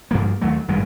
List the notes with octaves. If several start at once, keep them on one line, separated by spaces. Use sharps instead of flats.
G2 F3 A#3
D#2 F#3 A3
G#1 G2 A#2 G#3